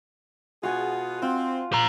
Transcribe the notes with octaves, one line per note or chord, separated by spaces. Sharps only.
B2 F4 F#4 G#4 G#5
C4 F4
C5 A#5